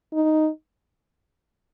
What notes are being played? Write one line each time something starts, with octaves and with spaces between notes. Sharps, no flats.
D#4